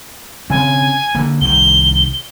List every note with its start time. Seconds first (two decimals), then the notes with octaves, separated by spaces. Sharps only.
0.50 C#3 C4 G#5
1.15 D3 A#3
1.41 C2 D#3 G7